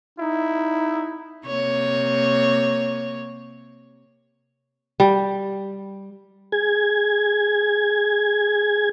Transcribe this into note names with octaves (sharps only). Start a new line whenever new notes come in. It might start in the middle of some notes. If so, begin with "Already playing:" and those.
D#4 E4
C3 A#3 C#5
G3
G#4 G#6